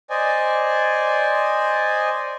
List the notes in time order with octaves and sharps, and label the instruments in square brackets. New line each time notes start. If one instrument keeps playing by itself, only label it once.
[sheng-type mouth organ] C5 D5 D#5 G#5